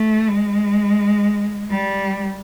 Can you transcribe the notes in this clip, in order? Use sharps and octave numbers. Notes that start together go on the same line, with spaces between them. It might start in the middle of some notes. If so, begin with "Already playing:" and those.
Already playing: A3
G#3
G3